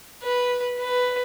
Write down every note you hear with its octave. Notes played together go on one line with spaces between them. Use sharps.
B4
B4